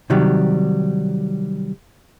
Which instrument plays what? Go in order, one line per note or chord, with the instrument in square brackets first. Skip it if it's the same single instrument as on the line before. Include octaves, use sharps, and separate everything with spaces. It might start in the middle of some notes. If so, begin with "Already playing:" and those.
[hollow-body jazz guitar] C3 D#3 F#3 G3